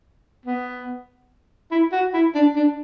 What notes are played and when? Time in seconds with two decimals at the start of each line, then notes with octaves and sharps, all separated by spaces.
0.46 B3
1.71 E4
1.92 F#4
2.14 E4
2.35 D4
2.56 D4